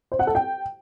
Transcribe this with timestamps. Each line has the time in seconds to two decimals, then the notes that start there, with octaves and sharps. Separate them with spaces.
0.12 C5
0.19 F#5
0.27 A4
0.35 G5